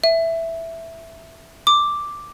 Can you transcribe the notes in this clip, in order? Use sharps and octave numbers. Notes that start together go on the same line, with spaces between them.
E5
D6